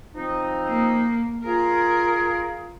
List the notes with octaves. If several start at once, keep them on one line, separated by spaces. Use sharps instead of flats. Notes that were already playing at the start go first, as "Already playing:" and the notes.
F3 C4 D#4
A#3
F4 G#4 A#4